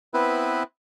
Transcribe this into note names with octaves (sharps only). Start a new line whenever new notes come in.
B3 C4 E4 B4